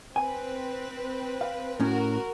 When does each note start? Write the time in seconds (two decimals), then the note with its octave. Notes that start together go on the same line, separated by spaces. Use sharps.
0.16 C4 B4 G#5
1.41 F5
1.80 A2 C#4 F#4 A#4